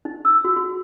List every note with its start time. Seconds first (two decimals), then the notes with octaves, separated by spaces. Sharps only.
0.05 D#4
0.25 E6
0.45 F#4
0.56 F#4